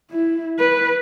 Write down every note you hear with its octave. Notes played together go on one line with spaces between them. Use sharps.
E4
B4